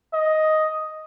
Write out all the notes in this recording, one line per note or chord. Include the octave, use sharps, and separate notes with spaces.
D#5